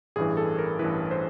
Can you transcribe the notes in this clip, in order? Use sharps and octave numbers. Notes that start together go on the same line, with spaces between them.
A1 G2 E3 G#4
A4
A#4
A1 G2 E3 B4
C5